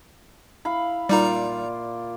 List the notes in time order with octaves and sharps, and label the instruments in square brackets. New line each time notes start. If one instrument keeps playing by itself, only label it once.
[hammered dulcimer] E4 F5 B5
[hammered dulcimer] A#2 F4 D5 [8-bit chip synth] G3 D#4 A#5